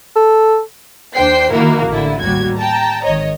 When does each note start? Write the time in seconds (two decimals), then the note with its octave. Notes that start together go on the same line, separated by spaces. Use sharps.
0.16 A4
1.15 D#2 D4 C5 G5 C7
1.52 D#3 F3 A#3 E4 F#4 A#4
1.87 A1 D3 E4
2.21 A1 D#2 G3 F#4 G#6
2.56 G5 A5 A#5
3.04 G#1 D#3 C#5 D#5